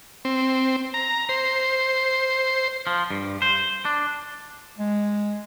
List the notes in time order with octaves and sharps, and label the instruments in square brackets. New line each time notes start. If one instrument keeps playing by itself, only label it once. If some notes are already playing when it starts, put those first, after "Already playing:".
[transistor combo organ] C4
A#5
C5
[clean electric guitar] F3
G2
C5
D4
[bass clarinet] G#3